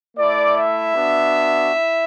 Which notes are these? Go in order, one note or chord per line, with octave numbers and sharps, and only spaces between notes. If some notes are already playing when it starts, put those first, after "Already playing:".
A3 E4 D5
E5
B3 D4 F#4
E4